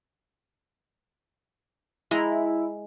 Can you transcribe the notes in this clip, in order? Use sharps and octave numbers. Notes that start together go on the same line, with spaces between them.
G#3 E4 A#5